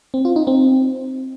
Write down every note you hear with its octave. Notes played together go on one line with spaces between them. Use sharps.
C4
F4
D#4
C4